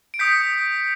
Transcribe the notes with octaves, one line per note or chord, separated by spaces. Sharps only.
D7
D#6 G6 B6 C#7